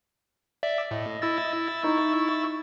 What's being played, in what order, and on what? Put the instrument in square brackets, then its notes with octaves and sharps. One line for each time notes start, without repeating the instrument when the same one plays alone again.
[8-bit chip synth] D5 E5
[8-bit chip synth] A2 [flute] D#5
[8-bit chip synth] E4 E6 A6
[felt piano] D#4 [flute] C#6